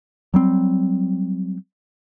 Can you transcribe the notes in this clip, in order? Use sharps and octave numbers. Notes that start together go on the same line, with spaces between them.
F#3 G3 C4